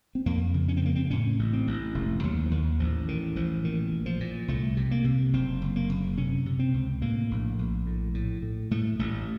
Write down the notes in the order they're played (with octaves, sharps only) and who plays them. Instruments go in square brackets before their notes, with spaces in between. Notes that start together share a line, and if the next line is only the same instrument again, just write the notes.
[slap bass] C4
F2 A#3
C#3
C#4
C4
C#3 A#3
C4
A2 C#4
A1
C4
A1
F1 A3
D#2 F#3
F3
D#2 D#3
A1 F3
A2 D#3
A1 F3
A#2 D#3
A#2
F3
A#2
C2 A3
C3
A#3
C3
F#1 C4
F#1
A#3
F#1
C3 C#4
C3
C4
C#2
A2 A#3
A#1
A#1
A2
A2
A2
A2 A3
A1 A3